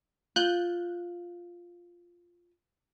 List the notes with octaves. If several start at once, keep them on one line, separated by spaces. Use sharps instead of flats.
F4 F#6 G6